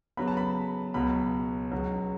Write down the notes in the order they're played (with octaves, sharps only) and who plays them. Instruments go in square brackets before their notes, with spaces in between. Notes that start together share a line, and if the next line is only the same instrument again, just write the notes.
[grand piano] C#3 F#3 B3 B5
A5
B5
C#2 B2 F#3 B5
C#2 C#3 F#3